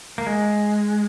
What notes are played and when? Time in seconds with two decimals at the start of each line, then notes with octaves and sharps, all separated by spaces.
0.18 A#3
0.27 G#3